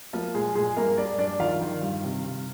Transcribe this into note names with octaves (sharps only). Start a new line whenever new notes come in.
F3 A#3 F4
A#2 G#3 G#4
A#2 G#3 G#4
G2 A#3 A#4
G2 D4 D5
G2 D4 D5
D#3 F4 F5
D#3
G2
C3
C3